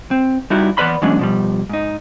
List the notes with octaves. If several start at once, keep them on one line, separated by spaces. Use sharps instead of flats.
C4
G3 D#4 E4 F#4
E3 B3 B4 D5 B5 C6
E3 F#3 G#3 A#3 C#4 D4
B2 F3 G3
G#2 D#4